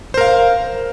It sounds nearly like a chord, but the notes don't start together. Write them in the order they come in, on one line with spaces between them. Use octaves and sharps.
C5 A#4 F5